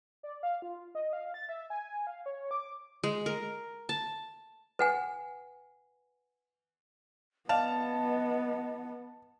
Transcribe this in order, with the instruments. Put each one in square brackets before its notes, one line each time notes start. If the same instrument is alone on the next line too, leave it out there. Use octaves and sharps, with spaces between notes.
[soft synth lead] D5
F5
F4
D#5
F5
A6
E5
G#5
F5
C#5
D6
[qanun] G#3
A#4
A5
[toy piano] B4 F#5 G#5
[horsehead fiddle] B3 [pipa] D5 F5 [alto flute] D#5 [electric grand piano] A5